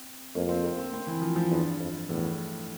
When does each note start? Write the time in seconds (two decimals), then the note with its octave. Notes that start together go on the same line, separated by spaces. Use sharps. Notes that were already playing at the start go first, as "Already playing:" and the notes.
Already playing: C4
0.35 F2 A#3
0.49 C4
0.64 A#3
0.78 C4
0.93 C4
1.07 E3
1.22 F3
1.36 F3
1.51 E2 G2
1.80 F2
2.09 E2 A2